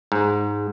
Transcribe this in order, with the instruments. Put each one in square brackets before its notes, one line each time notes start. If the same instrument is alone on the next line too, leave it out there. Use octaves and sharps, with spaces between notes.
[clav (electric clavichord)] G#2